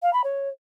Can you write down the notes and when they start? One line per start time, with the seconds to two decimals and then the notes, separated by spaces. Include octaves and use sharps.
0.03 F5
0.13 B5
0.24 C#5